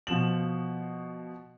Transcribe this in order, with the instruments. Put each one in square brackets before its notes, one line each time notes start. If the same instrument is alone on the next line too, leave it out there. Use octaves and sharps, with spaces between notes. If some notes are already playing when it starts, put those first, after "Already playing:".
[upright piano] B2 F3 E7 F#7